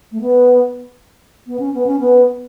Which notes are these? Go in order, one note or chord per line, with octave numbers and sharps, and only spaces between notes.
A3
B3
B3
C#4
B3
C#4
B3